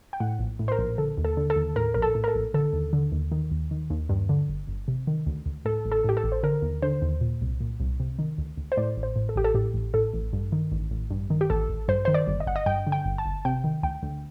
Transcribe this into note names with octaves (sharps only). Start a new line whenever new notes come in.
G5
A2 F#5
A#1
A2
C5
A#4
A#1
D3 A4
D#2
A4
D3
A4
D#2
A2 A#4
A#1 A#4
A4
A2
A#4
A4
A#1
D3 A4
D#2
D3
D#2
D#3
D#2
D#3
D#2
G2
D3
G1
G1
C3
D#3
D2
D2
A2 A4
A1
A4
A2 G4
A4
A1
C5
D3 A#4
D#2
D3 C5
D#2
A#2
C2
A#2
C2
C3
D#3
D2
D2
C5
A2 D5
A1
C5
A2
A4
A1 G4
A4
A2 G4
A1
A2 A4
A1
G2
D#3
A1
A1
G2
D#3
G4
A1 A4
A1
G2 C5
D#3 C5
D5
G1
D#5
G1 F#5
D#5
G2 G5
D3
G5
G1
A5
G1
C3 G5
D#3
D2 G5
D2